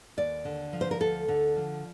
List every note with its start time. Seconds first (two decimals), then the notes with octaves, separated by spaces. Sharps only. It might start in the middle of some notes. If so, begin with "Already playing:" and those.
0.17 D#2 D5
0.45 D3
0.73 F3
0.81 C5
0.91 A#4
1.00 D2 A4
1.28 D3
1.56 F3